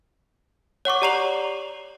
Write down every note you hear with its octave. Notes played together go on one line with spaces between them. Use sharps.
C#5 F#5 C#6 D6
G4 D5 A#5 C7 F7 F#7